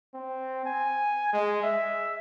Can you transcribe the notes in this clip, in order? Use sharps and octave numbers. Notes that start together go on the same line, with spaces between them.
C4
G#5
G#3
E5